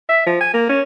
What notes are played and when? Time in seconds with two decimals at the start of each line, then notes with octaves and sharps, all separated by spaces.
0.09 E5
0.26 F3
0.41 G#5
0.54 A#3
0.69 C#4